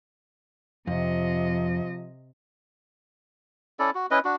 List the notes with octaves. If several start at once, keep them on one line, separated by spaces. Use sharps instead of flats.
F2 C3 F3 D#5
C#4 E4 A4 D5
F#4
C#4 E4 B4 D#5
D4 F#4